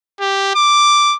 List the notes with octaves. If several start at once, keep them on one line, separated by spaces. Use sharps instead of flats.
G4
D6